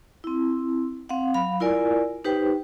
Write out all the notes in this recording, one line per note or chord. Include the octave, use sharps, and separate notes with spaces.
C4 E4
C4 F5 F#5
F#3 F5 B5
E4 F4 A#4 D5 G#5
D#4 G4 B4 C5 G5